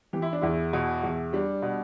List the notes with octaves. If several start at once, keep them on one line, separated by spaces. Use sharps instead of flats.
E3 G4
E4
D4
E2 E4
B2
E2
G3 D4
B2